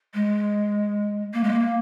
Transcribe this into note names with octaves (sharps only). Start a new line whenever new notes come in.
G#3
A#3
G#3
A#3